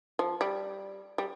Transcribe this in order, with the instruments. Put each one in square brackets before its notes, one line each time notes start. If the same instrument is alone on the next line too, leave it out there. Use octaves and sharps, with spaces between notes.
[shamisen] F3
G3
G3